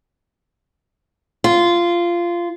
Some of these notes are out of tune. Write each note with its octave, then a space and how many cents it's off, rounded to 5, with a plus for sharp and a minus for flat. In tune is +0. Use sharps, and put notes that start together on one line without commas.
F4 -15